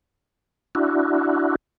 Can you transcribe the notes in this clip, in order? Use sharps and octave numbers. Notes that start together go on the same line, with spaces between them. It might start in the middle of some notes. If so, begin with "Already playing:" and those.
D4 E4 F#4